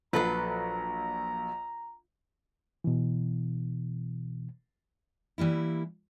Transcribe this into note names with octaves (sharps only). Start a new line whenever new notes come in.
A#1 F#3 A4 B4 A#5
B2 E3
E3 G3 A#3 E4